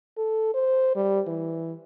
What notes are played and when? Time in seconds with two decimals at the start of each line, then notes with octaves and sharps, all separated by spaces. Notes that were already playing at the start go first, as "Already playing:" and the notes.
0.17 A4
0.54 C5
0.95 G3
1.27 E3